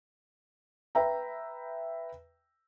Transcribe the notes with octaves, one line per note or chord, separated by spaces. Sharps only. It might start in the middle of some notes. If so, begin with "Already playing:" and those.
B4 E5 G5 A#5